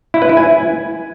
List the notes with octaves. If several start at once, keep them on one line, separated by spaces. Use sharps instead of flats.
E4
B4
E4
G#5